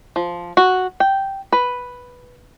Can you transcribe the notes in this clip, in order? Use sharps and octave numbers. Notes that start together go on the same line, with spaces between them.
F3
F#4
G5
B4